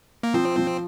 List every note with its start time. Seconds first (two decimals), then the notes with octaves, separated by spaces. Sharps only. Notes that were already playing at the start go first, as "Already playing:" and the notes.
0.23 A#3
0.34 F3 C4
0.57 F3